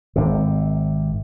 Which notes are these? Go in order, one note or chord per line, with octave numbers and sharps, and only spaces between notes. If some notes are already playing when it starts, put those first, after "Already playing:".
G#1 C3